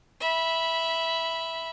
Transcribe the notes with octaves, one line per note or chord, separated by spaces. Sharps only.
E5 B5